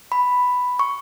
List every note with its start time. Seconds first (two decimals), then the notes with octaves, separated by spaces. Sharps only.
0.12 B5
0.79 C#6